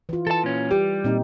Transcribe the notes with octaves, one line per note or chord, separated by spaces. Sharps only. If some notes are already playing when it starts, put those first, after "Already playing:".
E3 F4
E3 A4 A5
A#2 C#4
G3 G4
A#2 C4 D#4